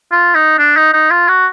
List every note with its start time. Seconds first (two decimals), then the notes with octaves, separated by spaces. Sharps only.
0.12 F4
0.35 D#4
0.58 D4
0.76 D#4
0.93 D#4
1.11 F4
1.28 F#4